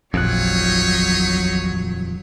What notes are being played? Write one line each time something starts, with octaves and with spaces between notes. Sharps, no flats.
D#1 A1 F2 A#2 F#3 D#4 C#5 F#6